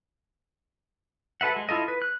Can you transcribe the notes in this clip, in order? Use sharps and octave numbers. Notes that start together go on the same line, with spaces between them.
F#4 A4 B4 E5 F#5
G#3
E4 F4 A4 D#5
B4
F#6